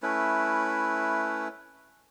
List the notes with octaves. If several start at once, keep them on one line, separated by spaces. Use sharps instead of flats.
A3 C#4 E4 B4